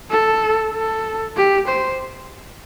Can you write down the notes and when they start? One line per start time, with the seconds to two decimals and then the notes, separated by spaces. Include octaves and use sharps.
0.11 A4
0.74 A4
1.37 G4
1.68 C5